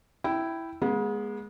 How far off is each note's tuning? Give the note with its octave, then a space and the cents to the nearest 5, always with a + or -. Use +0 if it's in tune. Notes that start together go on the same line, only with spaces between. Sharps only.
E4 +0 G5 -10
G#3 +0 B3 -40